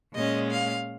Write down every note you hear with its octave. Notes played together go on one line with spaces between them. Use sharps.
A#2 G#3 C#4 D#5
F5